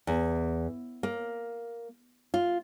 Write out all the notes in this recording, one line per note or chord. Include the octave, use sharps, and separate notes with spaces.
E2
A#3
F4